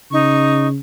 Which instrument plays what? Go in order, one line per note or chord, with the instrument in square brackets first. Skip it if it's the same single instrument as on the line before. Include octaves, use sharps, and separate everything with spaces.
[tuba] C#3 [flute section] D#4 C#6